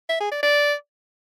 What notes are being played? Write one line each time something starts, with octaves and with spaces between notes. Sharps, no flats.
E5
G#4
D5
D5